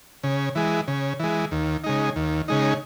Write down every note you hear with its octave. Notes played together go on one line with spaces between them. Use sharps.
C#3
E3 G#3
C#3
E3 G#3
D#2
C#3 G#3 D#4
D#2
C#3 G#3 D#4